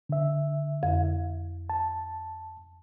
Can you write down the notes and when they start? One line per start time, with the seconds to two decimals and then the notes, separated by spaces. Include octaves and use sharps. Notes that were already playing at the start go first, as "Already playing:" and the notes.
0.09 D3 E5
0.83 F2
1.70 A5